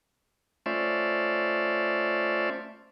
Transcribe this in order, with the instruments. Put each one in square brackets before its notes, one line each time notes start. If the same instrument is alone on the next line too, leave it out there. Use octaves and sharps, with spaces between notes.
[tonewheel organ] A3 C#4 F4 C5 D5 E5